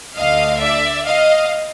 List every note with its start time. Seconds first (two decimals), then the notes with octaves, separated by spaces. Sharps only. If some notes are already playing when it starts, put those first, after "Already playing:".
0.16 D2 D3 D#5 F5
0.60 D5 E5
1.05 D#5 F5